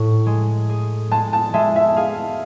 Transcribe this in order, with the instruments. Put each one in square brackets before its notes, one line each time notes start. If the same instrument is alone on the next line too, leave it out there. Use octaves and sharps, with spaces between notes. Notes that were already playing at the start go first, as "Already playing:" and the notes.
Already playing: [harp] A2
G#3
G#4
[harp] G#3 [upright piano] A5
[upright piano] A5
[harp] G#3 [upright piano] E5
[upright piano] E5
[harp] G#4 [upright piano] F5